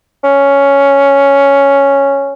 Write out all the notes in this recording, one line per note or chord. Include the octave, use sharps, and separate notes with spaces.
C#4